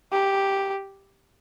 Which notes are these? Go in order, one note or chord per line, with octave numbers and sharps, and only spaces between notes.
G4